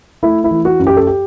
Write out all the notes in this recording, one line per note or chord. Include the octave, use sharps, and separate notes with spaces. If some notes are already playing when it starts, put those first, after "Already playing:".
A3 E4
E4
E3
F#4
F#2
G4
A4
G4